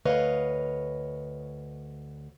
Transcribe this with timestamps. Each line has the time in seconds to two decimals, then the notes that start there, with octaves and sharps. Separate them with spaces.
0.05 D2 B4 C#5 D#5 F5